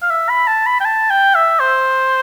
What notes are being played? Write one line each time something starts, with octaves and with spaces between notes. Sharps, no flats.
F5
E5
B5
A5
B5
G5
A5
G5
E5
C5